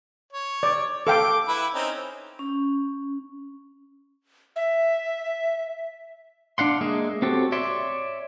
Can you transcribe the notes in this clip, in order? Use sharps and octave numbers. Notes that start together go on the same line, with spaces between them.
C#5
D5
A4 F5 G5 D6
E4 B4
C4 C#4 D#4
C#4
E5
D4 F5 F#5 C6
G#3 A#3 G#4 E5
C4 F#4 G4 A4 C#5
C#5 D5 E5 C6